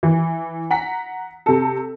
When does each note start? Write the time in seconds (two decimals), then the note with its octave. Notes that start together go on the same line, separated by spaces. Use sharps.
0.03 E3
0.70 F#5 A#5 B6
1.46 C3 A4